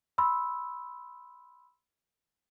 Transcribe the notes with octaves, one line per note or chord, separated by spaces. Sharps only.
B5 C6 E6